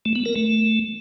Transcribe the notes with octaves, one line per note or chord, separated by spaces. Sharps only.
A3
B3
A#4
A3